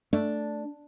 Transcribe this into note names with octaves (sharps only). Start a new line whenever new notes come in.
A3 D4